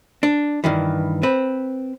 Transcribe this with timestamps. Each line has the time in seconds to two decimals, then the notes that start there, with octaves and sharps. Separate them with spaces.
0.23 D4
0.64 G2 D#3 E3
1.23 C4 B4